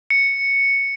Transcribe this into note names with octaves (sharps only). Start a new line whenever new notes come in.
C#7